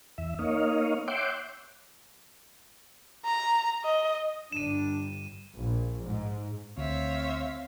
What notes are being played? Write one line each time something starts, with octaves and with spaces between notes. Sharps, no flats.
E2 E5
A#3 D#4 C#5 D#5 F5
C#5 E5 F#5 G5 C6 D6
A#5
D#5
G1 G3 D4 D#7 E7
A#1
G#2
D2 C4 C#5 E5 F5